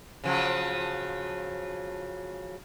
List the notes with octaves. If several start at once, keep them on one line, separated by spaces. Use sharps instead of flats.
C#3 F3 F#3